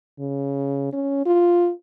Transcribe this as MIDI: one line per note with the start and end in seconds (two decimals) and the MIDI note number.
0.20 0.91 49
0.93 1.23 61
1.26 1.70 65